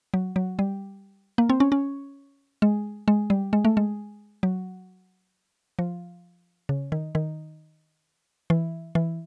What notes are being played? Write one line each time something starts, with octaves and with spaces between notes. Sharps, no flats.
F#3
F#3
G3
A#3
C4
C#4
C#4
G#3
G#3
G3
G#3
A3
G#3
F#3
F3
C#3
D#3
D#3
E3
E3